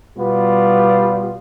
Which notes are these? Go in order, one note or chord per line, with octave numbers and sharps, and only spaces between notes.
B2 G3 B3 F4